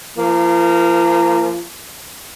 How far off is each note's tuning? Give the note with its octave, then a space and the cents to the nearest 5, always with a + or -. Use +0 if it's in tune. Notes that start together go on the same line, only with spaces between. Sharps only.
F3 -40 A#3 -20